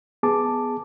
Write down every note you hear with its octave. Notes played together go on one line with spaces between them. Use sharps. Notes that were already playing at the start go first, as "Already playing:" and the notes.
B3 G#4 A5 D6